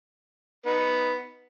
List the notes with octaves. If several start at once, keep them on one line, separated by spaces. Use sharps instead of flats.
B3 D#4 B4